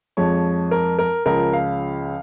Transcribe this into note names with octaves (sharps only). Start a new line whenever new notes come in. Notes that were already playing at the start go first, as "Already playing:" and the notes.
F2 F3 G#3 C#5
A#4
A#4
C#2 C#3 F3 A#4
F5